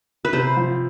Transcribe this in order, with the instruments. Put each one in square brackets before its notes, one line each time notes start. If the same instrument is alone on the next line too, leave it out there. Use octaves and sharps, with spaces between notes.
[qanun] B4
[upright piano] C3 [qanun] C5
[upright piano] F3